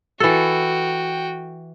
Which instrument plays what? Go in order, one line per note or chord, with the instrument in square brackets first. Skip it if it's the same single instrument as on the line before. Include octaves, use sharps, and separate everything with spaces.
[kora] E3 A4 [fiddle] F#4 G5